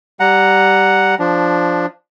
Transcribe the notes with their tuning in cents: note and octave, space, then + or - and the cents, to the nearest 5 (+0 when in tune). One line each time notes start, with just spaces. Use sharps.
G3 -10 F#5 +0 A#5 +0
F3 +0 D4 +0